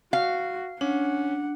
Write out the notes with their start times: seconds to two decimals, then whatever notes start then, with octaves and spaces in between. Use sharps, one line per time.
0.13 F#4 F5
0.81 C#4 D4 F#5